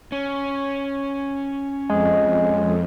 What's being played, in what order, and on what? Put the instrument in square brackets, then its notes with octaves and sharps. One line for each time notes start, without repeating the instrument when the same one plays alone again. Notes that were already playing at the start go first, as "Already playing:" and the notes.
[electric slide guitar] C#4
[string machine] F2 [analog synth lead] G#3